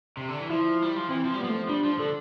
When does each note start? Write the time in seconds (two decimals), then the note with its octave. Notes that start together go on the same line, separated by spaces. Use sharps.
0.17 C3
0.29 D3
0.39 E3
0.49 F3 E4
0.82 G3
0.96 F3
1.09 E3 C4
1.25 F3
1.34 G3
1.40 B3
1.44 F3
1.49 A3
1.69 G3 D4
1.84 F3
1.99 D3 A4